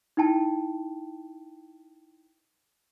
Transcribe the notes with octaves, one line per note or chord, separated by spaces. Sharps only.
D#4 E4 G5 A5